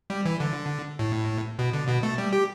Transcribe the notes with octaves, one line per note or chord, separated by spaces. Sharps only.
G3
E3
D3
A2
B2
D3
B2
A3
G3
G4